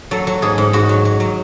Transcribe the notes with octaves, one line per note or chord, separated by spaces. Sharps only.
F#3 A4
F#3
G#2 G#4
G#2
G#2 F#4
F#3
F#3
F#3